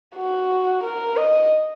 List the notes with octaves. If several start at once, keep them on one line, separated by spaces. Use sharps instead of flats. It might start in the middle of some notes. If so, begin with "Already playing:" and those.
F#4
A#4
D#5